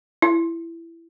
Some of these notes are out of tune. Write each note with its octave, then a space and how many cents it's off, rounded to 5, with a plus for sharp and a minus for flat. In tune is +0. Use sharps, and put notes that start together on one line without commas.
E4 +15